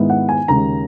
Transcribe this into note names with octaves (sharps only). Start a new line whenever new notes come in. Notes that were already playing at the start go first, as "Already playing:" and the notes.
Already playing: G#2 D#3 G#3 B3 E4
F#5
G#5
D#2 C#3 G#3 A#5